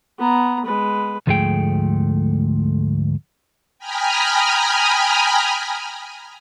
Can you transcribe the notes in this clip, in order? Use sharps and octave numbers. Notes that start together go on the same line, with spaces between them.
B3 A#5
G#3 B4
D2 G#2 F3 A3 G#4 G5
G5 G#5 A#5 B5 D#6 F6